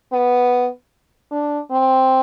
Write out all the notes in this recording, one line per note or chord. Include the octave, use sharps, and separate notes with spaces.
B3
D4
C4